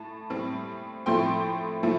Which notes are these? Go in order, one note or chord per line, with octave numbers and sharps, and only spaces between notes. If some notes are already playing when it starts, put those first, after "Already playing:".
Already playing: A2 A5
A2 G3 C4
A2 F3 A3 C4 G5 C6
A2 F3 A3 C4